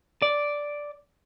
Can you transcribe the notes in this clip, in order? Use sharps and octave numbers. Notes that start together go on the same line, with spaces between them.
D5